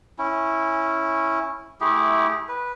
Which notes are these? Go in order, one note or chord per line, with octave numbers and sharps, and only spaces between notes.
C#4 E4
A3 E4 G4 G#4
B4